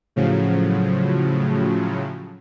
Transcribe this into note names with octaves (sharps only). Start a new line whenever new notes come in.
A2 C#3 F3 F#3